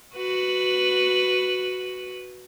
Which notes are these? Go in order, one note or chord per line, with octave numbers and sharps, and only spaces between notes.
F#4 B4